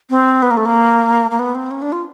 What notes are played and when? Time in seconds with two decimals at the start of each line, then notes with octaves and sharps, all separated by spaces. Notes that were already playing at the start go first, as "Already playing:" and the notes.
0.10 C4
0.42 B3
0.51 A#3
0.57 A3
0.65 A#3
1.31 A#3
1.39 B3
1.55 C4
1.71 C#4
1.82 D4
1.92 F4